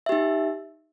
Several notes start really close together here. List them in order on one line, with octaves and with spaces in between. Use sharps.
E5 G4 D#4